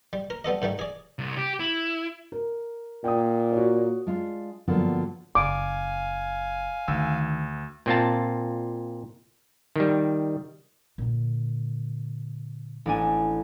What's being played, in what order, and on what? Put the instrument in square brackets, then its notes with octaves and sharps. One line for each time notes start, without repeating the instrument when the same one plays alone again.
[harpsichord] G3
A#4
G3 B3 A4 D#5
G#2 D#3 G3 A3
G#4 D5
[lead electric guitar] C2
G4
E4
[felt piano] A#4
[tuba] A#2 [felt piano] G5 D#6
[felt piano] F#4 C#5
[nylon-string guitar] G#3 D4 F4
G2 D3 F3 F#3 A#3 B3
[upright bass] F#1 [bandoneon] F5 G#5 [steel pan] D6
[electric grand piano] D2 E6 [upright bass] D#3
[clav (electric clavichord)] A#2 C4 F4 A5
D#3 G3
[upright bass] A#2 D3
[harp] A1 D4 G#5